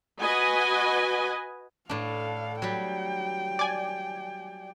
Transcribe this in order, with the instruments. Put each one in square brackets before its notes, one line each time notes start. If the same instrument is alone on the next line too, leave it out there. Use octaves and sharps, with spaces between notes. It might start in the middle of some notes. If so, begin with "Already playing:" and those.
[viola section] F#4 B4 D#5 G#5
[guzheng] A2 D4 [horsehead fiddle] A4 F5
[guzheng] F#3 G3 [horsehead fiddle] G5
[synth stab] D5 G#5